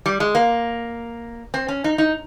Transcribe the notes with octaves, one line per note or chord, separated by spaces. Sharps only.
G3
G#3
A#3
C4
C#4
D#4
D#4